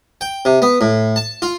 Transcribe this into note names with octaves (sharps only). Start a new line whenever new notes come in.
G5
C3
B3
A2
A5
F4